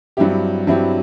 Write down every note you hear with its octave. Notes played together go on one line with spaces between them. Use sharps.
G2 F#3 C4 E4 G4
G2 F#3 C4 E4 G4